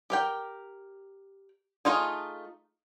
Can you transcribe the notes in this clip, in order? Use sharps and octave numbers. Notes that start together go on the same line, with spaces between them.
G4 A#4 G5
A3 D#4 F4 G#4